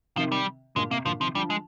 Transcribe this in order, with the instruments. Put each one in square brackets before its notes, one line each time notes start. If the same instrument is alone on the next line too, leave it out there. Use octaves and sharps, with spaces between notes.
[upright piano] C3 D#3 [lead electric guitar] F3
[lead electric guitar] G3
[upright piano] A#2 D3 [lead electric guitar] G#3
[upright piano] C3 [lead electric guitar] A#3
[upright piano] A#2 D3 [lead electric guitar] F3
[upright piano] C3 D#3 [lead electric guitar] F3
[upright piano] D3 F3 [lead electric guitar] G3
[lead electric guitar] G#3